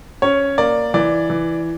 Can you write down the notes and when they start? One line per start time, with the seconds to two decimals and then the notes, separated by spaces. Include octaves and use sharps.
0.22 C#4 C#5
0.58 A#3 D5
0.94 E3 D5
1.30 E3